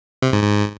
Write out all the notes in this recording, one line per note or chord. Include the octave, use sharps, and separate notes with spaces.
C3
G#2
G#2